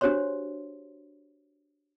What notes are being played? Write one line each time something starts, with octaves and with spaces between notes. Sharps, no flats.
D4 F#4 G4 C5 C#5 C6